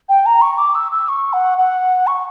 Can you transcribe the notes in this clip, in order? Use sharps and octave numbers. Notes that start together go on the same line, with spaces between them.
G5
A#5
C#6
D6
E6
E6
C#6
F#5
F#5
C#6